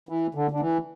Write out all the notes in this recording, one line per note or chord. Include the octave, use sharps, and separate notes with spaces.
E3
D3
D3
E3